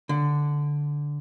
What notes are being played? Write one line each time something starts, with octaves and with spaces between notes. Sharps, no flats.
D3